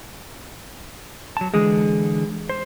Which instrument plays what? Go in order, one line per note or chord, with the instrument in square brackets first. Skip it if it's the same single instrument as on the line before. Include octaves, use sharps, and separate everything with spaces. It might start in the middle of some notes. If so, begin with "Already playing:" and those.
[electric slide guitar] F#3 A5
[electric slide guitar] D3 E3 G#4 [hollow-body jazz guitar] G#3
[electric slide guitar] C5